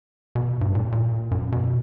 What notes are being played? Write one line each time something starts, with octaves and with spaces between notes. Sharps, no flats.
B2
G2
A#2
A#2
F#2
B2